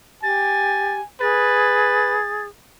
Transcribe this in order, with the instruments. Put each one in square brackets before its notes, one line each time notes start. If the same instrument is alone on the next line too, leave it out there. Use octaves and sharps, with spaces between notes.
[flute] G4 [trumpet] G#5 [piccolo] A6
[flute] G#4 [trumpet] B4 [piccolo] A6